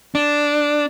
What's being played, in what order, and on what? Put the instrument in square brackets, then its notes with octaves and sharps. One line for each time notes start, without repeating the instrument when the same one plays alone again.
[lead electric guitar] D4